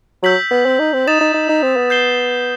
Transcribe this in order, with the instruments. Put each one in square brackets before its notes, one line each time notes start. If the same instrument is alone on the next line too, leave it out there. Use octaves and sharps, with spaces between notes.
[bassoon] F#3 [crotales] E6 G6 B6 F#7
[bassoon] B3
C4
D#4
C4
[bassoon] D#4 [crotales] D#6 A6 E7
[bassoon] D#4
D#4
D#4
C4
B3
[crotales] G6 C7 E7 G7